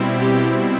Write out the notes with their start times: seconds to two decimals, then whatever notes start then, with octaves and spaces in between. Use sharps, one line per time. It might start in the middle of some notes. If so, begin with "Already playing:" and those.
Already playing: B2 G3 C4 E4
0.21 G4